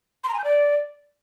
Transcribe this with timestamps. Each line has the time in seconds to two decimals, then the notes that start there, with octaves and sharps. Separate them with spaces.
0.24 C6
0.29 A#5
0.34 G#5
0.39 G6
0.44 D5